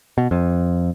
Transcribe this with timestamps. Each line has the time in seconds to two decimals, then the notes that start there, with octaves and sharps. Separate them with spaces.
0.18 B2
0.31 F2